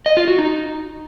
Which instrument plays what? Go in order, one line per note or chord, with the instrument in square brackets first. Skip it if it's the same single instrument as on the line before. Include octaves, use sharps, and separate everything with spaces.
[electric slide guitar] D#5
F4
F#4
D#4